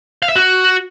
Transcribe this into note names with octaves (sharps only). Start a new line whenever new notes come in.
F5
E5
F#4